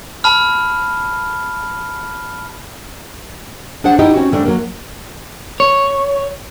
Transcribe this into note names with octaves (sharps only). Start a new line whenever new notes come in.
A5 B5 F6
D4 G#4 C5 F#5
D#4 E4 G4 D#5
C4 C#4 F#4
G#2 G3 A3 D4
F#3 A#3
C#5